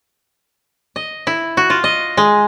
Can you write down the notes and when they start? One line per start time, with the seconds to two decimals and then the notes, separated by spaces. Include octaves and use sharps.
0.96 D#5
1.27 E4
1.57 F#4
1.70 F4
1.84 D#5
2.17 G#3